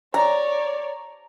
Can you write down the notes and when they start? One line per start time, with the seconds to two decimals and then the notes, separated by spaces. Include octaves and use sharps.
0.14 C#5 D5 A#5